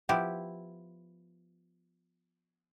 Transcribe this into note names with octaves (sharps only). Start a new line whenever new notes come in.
F3 B3 E4 G4